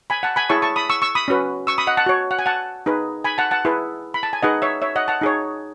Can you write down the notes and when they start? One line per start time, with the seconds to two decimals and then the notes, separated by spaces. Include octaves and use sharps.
0.10 G#5 B5
0.23 F#5 A5
0.36 G#5 B5
0.49 E4 G#4 C#5 A5 C#6
0.62 A5 C#6
0.76 B5 D#6
0.90 C#6 E6
1.02 C#6 E6
1.15 B5 D#6
1.28 C#4 F#4 B4
1.67 C#6 E6
1.78 B5 D#6
1.87 D#5 F#5
1.97 F#5 A5
2.06 F#4 C#5
2.31 F#5
2.39 G#5
2.46 F#5 A5
2.86 D#4 G#4 B4
3.24 G#5 B5
3.38 F#5 A5
3.51 F#5 A5
3.65 E4 G#4 B4
4.14 B5
4.23 A5
4.33 G#5
4.42 D#4 G#4 B4 D#5 F#5
4.62 C#5 E5
4.82 C#5 E5
4.96 D#5 F#5
5.08 F#5 A5
5.21 D#4 G#4 C#5